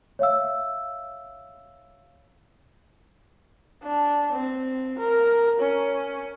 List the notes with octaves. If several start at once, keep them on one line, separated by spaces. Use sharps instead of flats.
C#5 E5 F5 E6
D4
C4
A#4
C#4